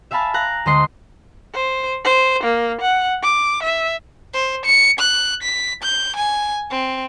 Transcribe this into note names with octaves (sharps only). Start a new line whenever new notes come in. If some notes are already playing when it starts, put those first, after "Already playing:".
E5 F5 G#5 A5 B5 F6
F5 A#5 F#6
D2 G#3 C5 D#5 C6 C7
C5
C5
A#3
F#5
D6
E5
C5
C#7
F#6
B6
G6
G#5
C4